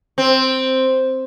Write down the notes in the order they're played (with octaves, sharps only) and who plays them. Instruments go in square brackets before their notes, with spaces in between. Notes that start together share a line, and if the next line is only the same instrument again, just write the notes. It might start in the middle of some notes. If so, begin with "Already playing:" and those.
[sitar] C4